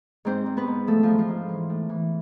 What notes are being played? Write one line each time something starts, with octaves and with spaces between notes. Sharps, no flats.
G#2 C4 C5
G#2
B3 B4
G#2
F3 A3 A4
G#2 F3 F4
F3 F4
G#2
E3
A2
E3